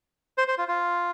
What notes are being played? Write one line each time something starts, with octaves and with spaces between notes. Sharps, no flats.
C5
C5
F4
F4